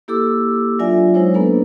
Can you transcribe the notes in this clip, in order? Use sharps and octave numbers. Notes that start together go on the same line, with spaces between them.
A#3 E4 G4 A4 D6 E6
F#3 D4 F4 D5 E5 G#5
F#3 G#3 D#4 E4 C5 C#5
A#3 B3 D4 A4 B4